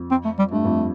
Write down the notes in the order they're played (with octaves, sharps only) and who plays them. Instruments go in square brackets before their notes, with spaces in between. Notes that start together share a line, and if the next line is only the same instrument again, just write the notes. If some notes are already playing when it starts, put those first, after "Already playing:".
Already playing: [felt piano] F2
[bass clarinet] C4
A3
G3
[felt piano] G2 [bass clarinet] A3
[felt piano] F2